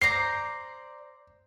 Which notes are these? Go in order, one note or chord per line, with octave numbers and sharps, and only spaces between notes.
C5 D5 A#5 C7